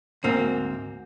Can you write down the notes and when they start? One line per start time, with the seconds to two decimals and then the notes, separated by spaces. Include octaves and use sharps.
0.24 D2 G#2 A#3 C4